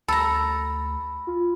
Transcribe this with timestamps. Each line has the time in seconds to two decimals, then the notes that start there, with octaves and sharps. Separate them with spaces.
0.08 D2 A4 A#5 B5
1.27 F4